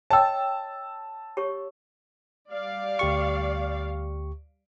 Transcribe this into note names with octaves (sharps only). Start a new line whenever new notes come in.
C#5 D#5 G5 A5 E6
G4 C#5 C#6
G3 D5 F5
D2 G4 C#6